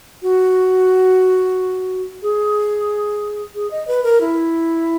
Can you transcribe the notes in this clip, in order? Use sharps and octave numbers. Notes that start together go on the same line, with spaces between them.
F#4
G#4
G#4
D#5
B4
A#4
E4